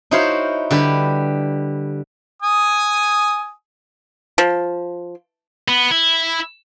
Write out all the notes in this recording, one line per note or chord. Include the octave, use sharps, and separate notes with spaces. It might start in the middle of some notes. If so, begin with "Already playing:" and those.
D#4 E4 F#4 C5 C#5 F5
D3 G3 B4
G#5 D#6
F3
B3
E4